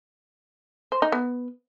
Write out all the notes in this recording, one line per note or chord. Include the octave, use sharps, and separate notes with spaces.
C5
D#4
B3